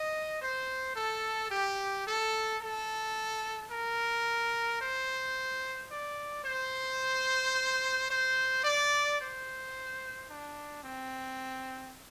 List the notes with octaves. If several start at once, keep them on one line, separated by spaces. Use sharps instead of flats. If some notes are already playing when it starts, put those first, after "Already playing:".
Already playing: D#5
C5
A4
G4
A4
A4
A#4
C5
D5
C5
C5
D5
C5
D4
C4